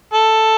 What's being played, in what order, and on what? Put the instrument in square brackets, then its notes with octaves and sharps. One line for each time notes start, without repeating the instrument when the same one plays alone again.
[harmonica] A4